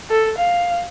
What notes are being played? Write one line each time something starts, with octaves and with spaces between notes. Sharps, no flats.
A4
F5